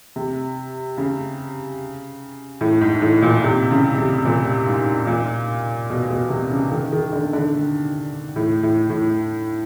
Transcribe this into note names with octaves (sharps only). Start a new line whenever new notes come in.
C3
C#3
A2
G#2
A2
A#2
C3
C#3
C3
A#2
G#2
A#2
B2
B2
C3
C#3
D#3
D#3
D3
D3
A2
A2
A2